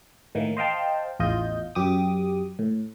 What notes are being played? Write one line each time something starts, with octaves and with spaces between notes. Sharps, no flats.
A2 D#3 E3 A#3
C5 D#5 F5 G5 A5
A1 E2 F4 D#5 G6
F#2 G4 D6 D#6
A2